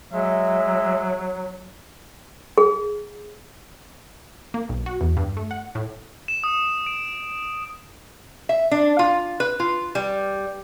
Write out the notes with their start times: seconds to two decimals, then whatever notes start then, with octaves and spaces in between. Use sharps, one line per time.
0.13 F#3 G#3 E5
2.58 G#4
4.54 A#3
4.69 B1
4.86 F#4
5.01 E2
5.17 G2
5.37 A3
5.51 F#5
5.75 A2
6.28 E7
6.44 D#6
6.86 D7
8.49 E5
8.71 D4
8.99 F4
9.40 B4
9.60 F4
9.95 G3